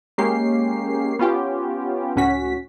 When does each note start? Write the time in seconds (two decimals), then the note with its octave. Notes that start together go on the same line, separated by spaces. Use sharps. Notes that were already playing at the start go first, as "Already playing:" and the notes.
0.18 G#3 A#3 C#4 G4 C7
1.19 B3 C#4 F4 G4
2.16 C#2 A2 C#4 F#4 B6